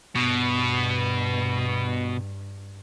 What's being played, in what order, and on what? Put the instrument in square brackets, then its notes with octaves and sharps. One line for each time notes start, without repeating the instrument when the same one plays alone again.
[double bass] G2 [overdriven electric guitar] B2